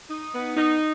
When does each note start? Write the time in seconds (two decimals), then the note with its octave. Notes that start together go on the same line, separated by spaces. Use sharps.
0.10 D#4
0.33 B3
0.56 D#4